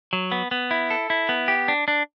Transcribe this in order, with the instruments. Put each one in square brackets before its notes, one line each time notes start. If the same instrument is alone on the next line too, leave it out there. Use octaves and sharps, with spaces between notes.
[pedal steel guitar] F#3
B3
B3
E4
A4
E4
B3
G4
D4
D4